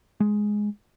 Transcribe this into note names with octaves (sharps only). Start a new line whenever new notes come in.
G#3